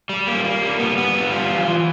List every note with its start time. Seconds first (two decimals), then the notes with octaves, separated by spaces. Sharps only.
0.09 G3
0.27 A#3
0.44 A#3
0.62 G3
0.80 B3
0.97 B3
1.15 G3
1.32 F4
1.49 E3
1.67 E3